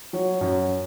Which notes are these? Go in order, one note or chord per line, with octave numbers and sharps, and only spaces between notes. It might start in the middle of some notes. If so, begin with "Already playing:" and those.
F#3
F#2